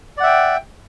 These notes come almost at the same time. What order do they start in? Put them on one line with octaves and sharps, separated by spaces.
D5 F#5 E5 G5